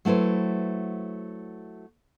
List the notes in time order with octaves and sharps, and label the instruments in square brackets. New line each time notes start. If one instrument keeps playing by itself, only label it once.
[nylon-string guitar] F#3 A3 E4 B4 C5